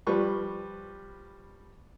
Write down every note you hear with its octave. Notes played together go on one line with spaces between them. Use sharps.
F3 G3 B4 C#6